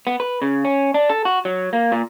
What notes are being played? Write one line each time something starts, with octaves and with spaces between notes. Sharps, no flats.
B3
B4
C#3
C#4
D4
A4
F#4
F#3
A#3
A#2